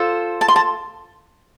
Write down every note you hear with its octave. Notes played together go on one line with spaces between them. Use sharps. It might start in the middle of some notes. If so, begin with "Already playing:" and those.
Already playing: F4 A4 C5
A5
C6
A5